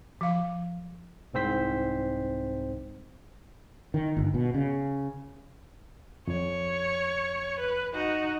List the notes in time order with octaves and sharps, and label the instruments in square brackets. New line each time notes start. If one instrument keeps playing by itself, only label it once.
[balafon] F3 F5
[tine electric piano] C2 G#2 C4 C5 B6
[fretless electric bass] D#3
G1
B2
C#3
[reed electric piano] F2 [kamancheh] C#5
[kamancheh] B4
D#4 F#4